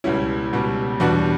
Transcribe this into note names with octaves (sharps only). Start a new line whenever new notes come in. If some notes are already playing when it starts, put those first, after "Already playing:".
C#2 B2 G3 C#4 E4
C#2 B2 G3
E2 B2 G3 D4 F#4